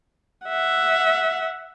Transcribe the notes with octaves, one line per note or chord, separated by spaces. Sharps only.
E5 F#5